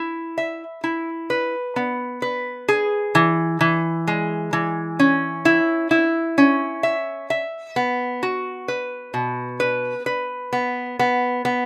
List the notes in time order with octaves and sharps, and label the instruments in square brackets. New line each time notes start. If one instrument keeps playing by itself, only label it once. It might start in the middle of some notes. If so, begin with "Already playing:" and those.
Already playing: [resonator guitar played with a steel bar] E4
E5
E4
B4
B3
B4
G#4
E3
E3
G#3
E3
C#4
E4
E4
C#4
E5
E5
B3
F#4
B4
B2
B4
B4
B3
B3
B3